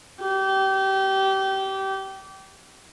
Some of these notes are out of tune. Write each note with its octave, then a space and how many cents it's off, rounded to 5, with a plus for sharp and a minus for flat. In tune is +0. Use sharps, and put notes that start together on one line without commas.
G4 -25